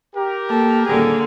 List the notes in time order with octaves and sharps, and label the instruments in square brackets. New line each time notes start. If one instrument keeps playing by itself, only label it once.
[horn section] G4 A#4
[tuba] A#3 [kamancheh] A4
[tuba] D#1 [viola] D3 A#3 [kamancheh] G#4